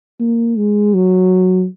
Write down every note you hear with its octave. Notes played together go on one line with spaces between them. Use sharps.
A#3
G#3
F#3